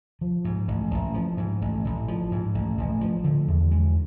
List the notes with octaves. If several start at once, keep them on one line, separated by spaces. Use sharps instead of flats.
F3
G#2
A1
A1
F3
G#2
A1
A1
F3
G#2
A1
A1
F3
D3
E2
G#3